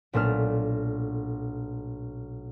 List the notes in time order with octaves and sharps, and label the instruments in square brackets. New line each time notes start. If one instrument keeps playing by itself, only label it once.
[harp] B1 A#2 A3 D4 F6